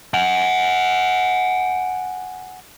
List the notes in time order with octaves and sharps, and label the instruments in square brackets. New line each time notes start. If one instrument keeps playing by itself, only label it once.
[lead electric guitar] F#5 G#5